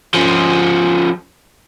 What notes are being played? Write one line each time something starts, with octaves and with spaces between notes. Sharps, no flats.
F3 C#4